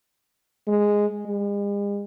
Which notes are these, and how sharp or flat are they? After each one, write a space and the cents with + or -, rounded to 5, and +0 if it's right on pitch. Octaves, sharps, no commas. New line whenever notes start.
G#3 -5
G#3 -45